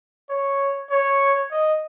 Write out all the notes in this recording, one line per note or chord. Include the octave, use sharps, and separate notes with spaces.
C#5
C#5
D#5